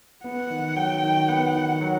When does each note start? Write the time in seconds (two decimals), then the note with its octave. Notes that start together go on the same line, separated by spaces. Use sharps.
0.24 B3 F#5
0.50 D#3
0.76 F#3 G5
1.03 D#3
1.28 B3 F#5
1.55 D#3
1.81 F#3